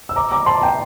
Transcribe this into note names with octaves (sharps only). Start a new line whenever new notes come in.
E6
A#5 D6
A#5 D6
A5 C6
G5 A#5